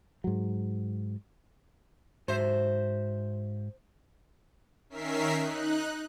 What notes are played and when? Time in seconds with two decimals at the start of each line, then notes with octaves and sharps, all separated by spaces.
0.24 G#2 F#3
2.28 G#2 F#4 C5 E5
4.90 D#3 C#4 A#4 E5 B6 C7
5.37 D#4 F#6